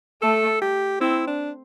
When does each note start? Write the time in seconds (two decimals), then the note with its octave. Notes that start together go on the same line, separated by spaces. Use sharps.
0.22 A3 A4
0.62 G4
1.01 C4 E4
1.28 D4